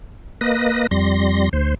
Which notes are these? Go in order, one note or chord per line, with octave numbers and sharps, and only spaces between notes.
A#3 B4 D#5 A#6
F2 G3 C6 A#6
D2 C5